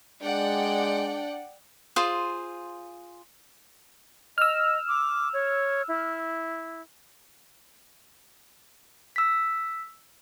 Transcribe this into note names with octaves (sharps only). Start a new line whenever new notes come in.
G#3 D4 D5 F#5 G5
F4 G#4 C5
D#5 E6 F6
D6
C#5
E4
E6 B6